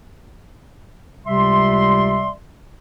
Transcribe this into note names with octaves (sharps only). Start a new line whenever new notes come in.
C#2 C3 G3 D5 E5 C6